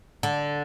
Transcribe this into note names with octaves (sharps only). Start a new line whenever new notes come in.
D3